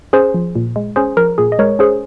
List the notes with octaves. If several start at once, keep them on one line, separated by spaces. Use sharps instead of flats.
C#4 G#4 C5
F3
A#2
G#3
C#4 G#4 C5
F3 A#4
A#2 G#4
D#5
G#3 A#4 C#5
C#4 G#4 C5